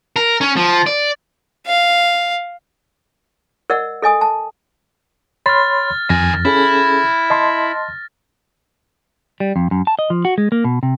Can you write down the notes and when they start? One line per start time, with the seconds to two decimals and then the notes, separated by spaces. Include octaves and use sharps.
0.16 A#4
0.41 C#4
0.56 F3
0.87 D5
1.67 F5
3.70 A#4 D5 D#5 F#5 E6
4.02 A4 D#5 G#5 D#6
4.21 A5
5.46 C#5 B5 C6 F6 A6
6.10 F2 D#3 G#5 A#6
6.45 C#4 E4 G#4 A4
7.30 D#5 A5 C6
9.40 G3
9.56 F2
9.71 F#2
9.87 A5
9.99 D#5
10.10 F3
10.25 F#4
10.38 G#3
10.52 A#3
10.64 B2
10.83 C3